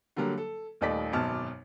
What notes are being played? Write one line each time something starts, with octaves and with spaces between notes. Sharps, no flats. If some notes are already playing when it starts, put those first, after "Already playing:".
D3 F#3 G3 A#3
A4
D#1 D#2 A3 D5 D#5 B6
G#1 F#2 B2 A5 D6 F6